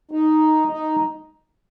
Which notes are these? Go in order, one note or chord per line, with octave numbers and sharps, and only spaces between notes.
D#4
D#4